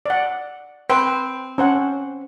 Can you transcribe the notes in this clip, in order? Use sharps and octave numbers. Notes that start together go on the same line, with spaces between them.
D5 F#5
C4 B4 G5
C#4 C5 F#5